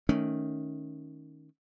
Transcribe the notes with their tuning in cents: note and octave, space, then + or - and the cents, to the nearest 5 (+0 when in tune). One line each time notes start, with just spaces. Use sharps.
D#3 +0 A3 -15 C#4 +0